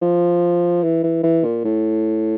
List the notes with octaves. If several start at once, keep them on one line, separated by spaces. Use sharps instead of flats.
F3
E3
E3
E3
A#2
A2